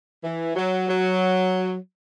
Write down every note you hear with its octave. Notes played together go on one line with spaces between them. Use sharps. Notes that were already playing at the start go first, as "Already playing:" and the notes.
E3
F#3
F#3